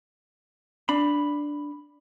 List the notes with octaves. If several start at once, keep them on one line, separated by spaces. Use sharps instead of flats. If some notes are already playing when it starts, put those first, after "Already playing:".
D4 B5